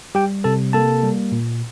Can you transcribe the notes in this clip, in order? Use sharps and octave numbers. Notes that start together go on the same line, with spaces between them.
G3 G4 G5
C3 A4 A5
A#3 A4 A5
G3
A#2